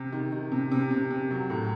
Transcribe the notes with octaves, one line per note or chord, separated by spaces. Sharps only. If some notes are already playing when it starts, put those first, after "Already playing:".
Already playing: C3
D#3
D#3
C3
C3
C3
C3
F#3
A2